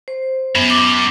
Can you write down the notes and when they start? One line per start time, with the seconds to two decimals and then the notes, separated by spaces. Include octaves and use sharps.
0.08 C5
0.55 F#2 B3
0.70 D6